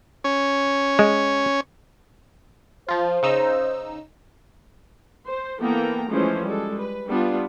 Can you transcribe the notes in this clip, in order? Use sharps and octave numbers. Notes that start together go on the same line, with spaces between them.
C#4 C#5
G#3
F3 F4 C5
C#3 D#4 E6
C5
E3 A#3 B3 A4 G5 A#5
E3 F3 G#3 A3 C#4 C5
G3 G#3 A4
B4
G3 B3 D4 F4